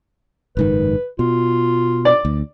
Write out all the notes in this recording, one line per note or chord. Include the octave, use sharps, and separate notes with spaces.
F#1 G#2 D#3 B4
B2 F4
D5
D2